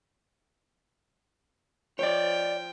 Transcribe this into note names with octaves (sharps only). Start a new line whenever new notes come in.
F3 C#5 D5 G5